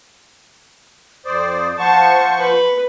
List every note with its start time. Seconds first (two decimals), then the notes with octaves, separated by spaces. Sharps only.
1.26 F2 C5 D5 D#6
1.79 F3 C5 F#5 A5 C#6
2.39 B4